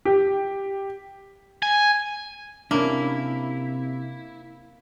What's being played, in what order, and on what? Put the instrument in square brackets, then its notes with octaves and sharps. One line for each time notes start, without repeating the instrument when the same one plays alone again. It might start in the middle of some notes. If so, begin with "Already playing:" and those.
[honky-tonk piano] G4
[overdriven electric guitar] G#5
[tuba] C3 [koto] A#3 [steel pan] C#4 D4 [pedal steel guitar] E4